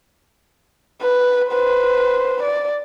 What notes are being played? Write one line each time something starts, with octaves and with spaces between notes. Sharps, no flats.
B4
B4 C5
D5